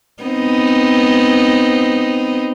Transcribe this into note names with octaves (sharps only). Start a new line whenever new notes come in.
B3 C4 D#4